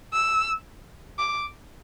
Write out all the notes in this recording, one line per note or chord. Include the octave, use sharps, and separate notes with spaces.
E6
D6